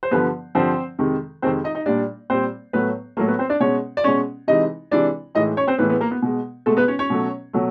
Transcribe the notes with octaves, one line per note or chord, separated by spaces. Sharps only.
C5
G2 D3 F3 B3 B4
G2 D3 F3 C4 C5
F2 C3 D#3 G#3
F2 C3 D#3 G#3 C4 C5
D#4 D#5
D#4 D#5
A#2 G3 D4 D5
A#2 G3 C4 C5
A2 F#3 A3 B3 B4
A2 F#3 A3 A#3 A#4
B3 B4
C4 C5
D4 D5
B2 G#3 C#4 C#5
D5
B2 G#3 C#4 C#5
C3 E3 G#3 D#4 D#5
C3 E3 G#3 D4 D5
A2 E3 G#3 D#4 D#5
C#4 C#5
C4 C5
A2 E3 G#3 B3 B4
B3 B4
A#3 A#4
B3 B4
B2 G#3
B2 G#3 A3 A4
B3 B4
C#4 C#5
C#4 C#5
B2 F#3 A3
B2 F#3 A3